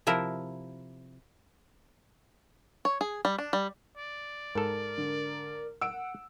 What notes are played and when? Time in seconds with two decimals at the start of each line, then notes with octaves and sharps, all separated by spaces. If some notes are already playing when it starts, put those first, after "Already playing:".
0.07 C3 F3 E4 A#4
2.85 C#5
3.01 G#4
3.25 G3
3.39 D4
3.53 G3
3.97 D5
4.55 G#2 A4 A#4
4.98 D3
5.81 F#5 E6 D7